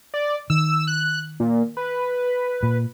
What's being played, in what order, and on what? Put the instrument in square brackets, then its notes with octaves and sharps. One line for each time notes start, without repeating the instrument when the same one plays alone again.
[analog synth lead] D5
[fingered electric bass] D#3 [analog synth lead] E6
[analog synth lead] F#6
A#2
B4
[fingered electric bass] A#2